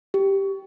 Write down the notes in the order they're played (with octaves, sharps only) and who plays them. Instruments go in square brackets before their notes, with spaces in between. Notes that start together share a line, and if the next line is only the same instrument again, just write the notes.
[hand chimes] G4